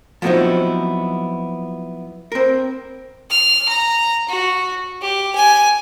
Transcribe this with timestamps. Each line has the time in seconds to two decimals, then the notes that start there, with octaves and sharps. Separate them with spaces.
0.22 F3 F#3 B3 C4 D#4 E4
2.32 C4 A#4
3.30 F6
3.68 A#5
4.28 F#4
5.01 G4
5.35 G#5